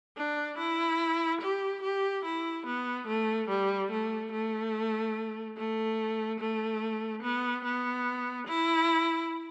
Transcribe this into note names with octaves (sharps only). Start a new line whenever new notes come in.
D4
E4
G4
G4
E4
B3
A3
G3
A3
A3
A3
A3
B3
B3
E4